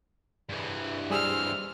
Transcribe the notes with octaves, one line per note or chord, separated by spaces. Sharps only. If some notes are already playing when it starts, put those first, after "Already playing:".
G2 E3 G#4
G3 G#4 C5 E6 F6